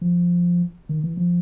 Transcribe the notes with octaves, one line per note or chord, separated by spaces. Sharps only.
F3
D#3
E3
F3